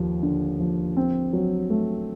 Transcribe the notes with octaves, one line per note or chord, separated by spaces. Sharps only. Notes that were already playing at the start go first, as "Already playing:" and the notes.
Already playing: D#2 F3
D3
F3
C4
F#3
A3